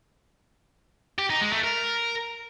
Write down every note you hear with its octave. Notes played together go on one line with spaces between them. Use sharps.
G4
D#4
G#3
A3
A#4